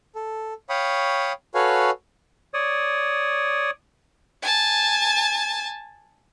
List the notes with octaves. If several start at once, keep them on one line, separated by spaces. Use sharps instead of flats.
A4
C#5 F5 G5 B5 C#6 D#6
F#4 A4 B4 C#5 F5 G#5
C#5 D5 D#6
G#5 A5